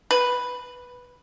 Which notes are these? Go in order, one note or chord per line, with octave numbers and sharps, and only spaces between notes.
B4